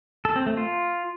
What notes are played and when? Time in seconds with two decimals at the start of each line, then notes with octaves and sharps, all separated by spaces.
0.25 A4
0.36 C4
0.46 A3
0.57 F4